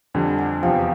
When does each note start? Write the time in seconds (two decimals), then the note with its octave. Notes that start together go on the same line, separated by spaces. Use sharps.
0.14 F2 D3 G3 G#5
0.39 F#5 G#5
0.63 E2 C3 F3 F5 G5